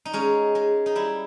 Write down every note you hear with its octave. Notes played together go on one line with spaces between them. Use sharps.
D#4
G#3 C#4
G#3
D#4
G3 E4